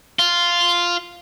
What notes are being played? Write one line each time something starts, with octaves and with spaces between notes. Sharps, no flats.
F4